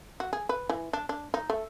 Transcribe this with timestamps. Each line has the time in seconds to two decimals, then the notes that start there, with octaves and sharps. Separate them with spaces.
0.20 F#4
0.33 G#4
0.49 B4
0.69 E3
0.93 D4
1.09 D4
1.34 D#4
1.50 A3